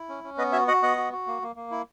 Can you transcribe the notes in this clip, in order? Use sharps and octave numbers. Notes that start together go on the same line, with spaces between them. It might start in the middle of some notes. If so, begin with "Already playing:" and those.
Already playing: E4
C#4
C#4
B3 B4 D#5
F#4 C#5 E5
F#4 D#5 F#5
B3 D#5 F#5
F#4
F#4
A#3
A#3
A#3
E4